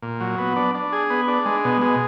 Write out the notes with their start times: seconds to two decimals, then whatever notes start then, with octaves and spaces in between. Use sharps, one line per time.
0.02 A#2
0.20 F#3
0.38 B3
0.56 D4
0.75 D4
0.93 G#4
1.10 B3
1.28 D4
1.45 G#3
1.65 B2
1.82 G#3